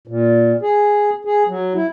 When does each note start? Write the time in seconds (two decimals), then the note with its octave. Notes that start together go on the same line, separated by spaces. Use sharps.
0.07 A#2
0.62 G#4
1.25 G#4
1.48 F#3
1.74 E4